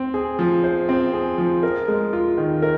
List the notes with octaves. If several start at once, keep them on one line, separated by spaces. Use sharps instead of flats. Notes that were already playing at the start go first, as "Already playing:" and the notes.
Already playing: C4
G#4
F3
C5
C4
G#4
F3
A#4
G#3
F4
D#3
A#4